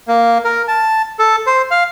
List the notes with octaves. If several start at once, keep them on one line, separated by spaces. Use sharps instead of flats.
A#3
A#4
A5
A4
C5
F5